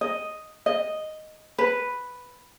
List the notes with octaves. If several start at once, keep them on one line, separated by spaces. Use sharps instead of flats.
D#5
D#5
B4